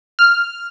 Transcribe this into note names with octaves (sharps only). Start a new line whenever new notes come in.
F6